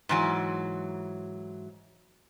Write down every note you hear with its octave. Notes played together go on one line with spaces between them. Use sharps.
G#2 E3 F#3